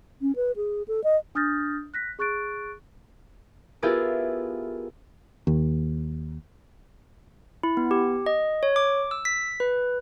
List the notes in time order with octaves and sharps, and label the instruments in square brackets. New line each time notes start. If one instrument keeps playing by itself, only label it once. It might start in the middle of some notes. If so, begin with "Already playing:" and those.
[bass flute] C#4
B4
G#4
A4
D#5
[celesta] D4 D#6 F6 G6 A6 A#6
F#6 A#6 B6
G#4 C#6 F#6 A6 D7
[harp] B3 E4 F4 G4 G#4 A#4
[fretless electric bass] D#2
[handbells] E4
B3
G4
D#5
C#5
D6
E6
B6
B4